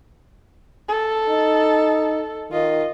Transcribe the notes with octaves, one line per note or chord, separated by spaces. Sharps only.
A4
D#4
D#3 F4 D#5